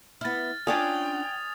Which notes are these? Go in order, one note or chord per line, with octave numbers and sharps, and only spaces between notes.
B3 E4 F6 A6
C#4 D4 F4 G5 G#5 D#6 F7